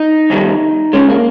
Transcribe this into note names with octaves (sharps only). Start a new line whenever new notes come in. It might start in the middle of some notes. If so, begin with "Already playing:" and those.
Already playing: D#4
F2 D#3 G3
C#2 C#3 G#3 C#4
A#3